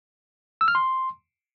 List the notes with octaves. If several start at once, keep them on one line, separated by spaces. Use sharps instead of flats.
E6
F6
C6